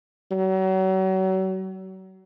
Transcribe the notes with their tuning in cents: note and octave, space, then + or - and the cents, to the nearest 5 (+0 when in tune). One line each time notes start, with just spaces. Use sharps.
F#3 +35